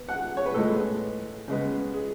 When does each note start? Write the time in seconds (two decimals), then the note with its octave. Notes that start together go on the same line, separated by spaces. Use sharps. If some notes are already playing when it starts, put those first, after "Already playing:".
Already playing: B3
0.09 F#5
0.37 C#5
0.46 B4
0.54 A2 G#3 B3 A4
1.48 C#3 G#3 B3
1.94 G#4